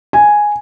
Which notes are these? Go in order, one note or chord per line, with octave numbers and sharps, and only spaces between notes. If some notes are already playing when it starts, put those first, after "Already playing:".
G#5